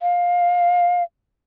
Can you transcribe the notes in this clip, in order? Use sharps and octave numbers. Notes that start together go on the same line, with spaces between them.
F5